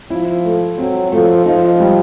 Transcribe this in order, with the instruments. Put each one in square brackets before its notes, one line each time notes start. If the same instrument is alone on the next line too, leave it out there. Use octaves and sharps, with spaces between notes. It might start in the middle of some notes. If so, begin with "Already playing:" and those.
[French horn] F3 [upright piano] E4
[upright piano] A3
[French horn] F#3 [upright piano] C4
[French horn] F3 [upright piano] A3
[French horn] F3 [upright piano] D#4
[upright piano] G3